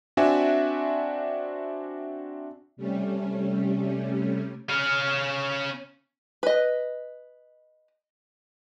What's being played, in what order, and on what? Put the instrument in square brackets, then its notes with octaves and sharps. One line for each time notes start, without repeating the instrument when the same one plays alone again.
[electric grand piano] C4 D4 F#4 D5 E5 G#5
[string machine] C3 G3 A3 C#4
[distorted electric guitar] C#4 F5
[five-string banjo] B4 D#5